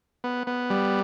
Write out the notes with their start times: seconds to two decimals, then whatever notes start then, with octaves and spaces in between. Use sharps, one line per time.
0.24 B3
0.47 B3
0.70 G3